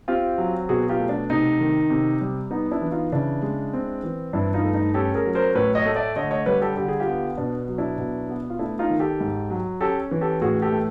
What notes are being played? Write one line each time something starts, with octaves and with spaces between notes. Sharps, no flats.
C4 F4 G4
F#3
B2 F#4 G#4
F4 G4
A3
D4
C3 D#4
D#3
C3
G3
B3 D#4
D4 E4
E3
D#4 F4
C#3 D4 E4
G#3
C4
E3
G2 D4 E4
D#4 F4
A3
D#4
C#4 G4 A4
G#4 A#4
F#3
A#4 C5
A2 B4 C#5
C#5 D#5
A3
D5 E5
D3 C#5 D#5
C#5 D#5
G3 B4 C#5
G4 A4
D3 G4
G#4
F4 G4
B3
B2 D4
F#3
D4 E4
B2
B3
F4
A3 D4 E4
D#4 F4
D#3
G4 A4
G#2
F#3
C#4 G4 A4
E3
G4 A4
A2 F#4 G#4
G4 A4
A3